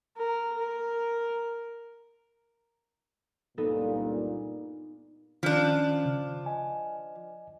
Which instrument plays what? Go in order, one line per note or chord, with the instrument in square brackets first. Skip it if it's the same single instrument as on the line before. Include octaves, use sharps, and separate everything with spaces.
[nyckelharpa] A#4
A#4
[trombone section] C#2 G2 A#2 [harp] B3 D#4 A4
[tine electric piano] D#3 C#4 F6 [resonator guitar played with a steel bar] F3 D4
[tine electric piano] C#3
D#5 G#5